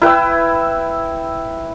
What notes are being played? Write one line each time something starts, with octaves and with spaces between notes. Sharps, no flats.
E4 B4 G5 E6